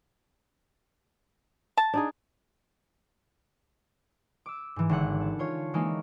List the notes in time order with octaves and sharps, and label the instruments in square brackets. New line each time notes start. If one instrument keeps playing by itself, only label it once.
[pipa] A5
[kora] D4 D#4 G#4
[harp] D6 E6
G#2 E3
G#1 D3 F#5
A5
F4 C#5
E3 G#3 A#3 C#4 D#4